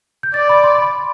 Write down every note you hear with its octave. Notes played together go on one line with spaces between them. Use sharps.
G6
D5 A6
B5
C6
B5